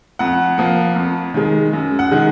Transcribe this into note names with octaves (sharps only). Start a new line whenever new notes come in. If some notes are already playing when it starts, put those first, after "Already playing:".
F2 F#5
F3 A#3
F2
D#3 G#3
F#2
F#5
D#3 G#3